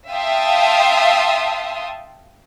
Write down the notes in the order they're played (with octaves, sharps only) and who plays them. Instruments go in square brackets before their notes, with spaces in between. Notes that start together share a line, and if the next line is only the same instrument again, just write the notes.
[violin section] E5 F5 G5 A5 C6 D#6